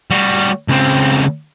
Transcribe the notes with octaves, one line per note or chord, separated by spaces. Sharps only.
G3 F#4
C#2 C4